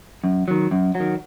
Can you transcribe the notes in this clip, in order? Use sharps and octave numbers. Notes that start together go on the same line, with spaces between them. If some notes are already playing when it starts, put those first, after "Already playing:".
F#2
D#3 F#3
F#2
F#3
D#3